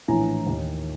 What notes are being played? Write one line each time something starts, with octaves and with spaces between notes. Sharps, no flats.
A#1 A2 E3 G#5 A#5
D#2 D#3